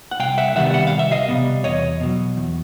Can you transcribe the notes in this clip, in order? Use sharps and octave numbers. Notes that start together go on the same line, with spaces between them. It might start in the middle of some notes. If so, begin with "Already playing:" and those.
F#5
C2 F5 G5
E5 F#5
C3 D#3 G3 B3 E5 F#5
F#5
C2 F5
E5
D#5 F5
C3 D#3 G3 B3
E2 C#5 D#5
B2 F#3
E2